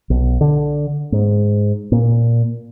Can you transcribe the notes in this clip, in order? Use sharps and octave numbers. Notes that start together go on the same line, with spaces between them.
B1
D3
G#2
A#2